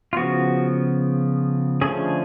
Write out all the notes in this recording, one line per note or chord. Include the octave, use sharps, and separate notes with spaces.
F4
C#3 F3 B3 F#4
D3 F3 A3 C#4 G#4